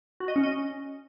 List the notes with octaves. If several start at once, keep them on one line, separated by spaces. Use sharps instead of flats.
F#4
D#5
C#4
D#5